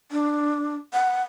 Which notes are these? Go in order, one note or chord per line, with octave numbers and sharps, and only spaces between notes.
D4
F#5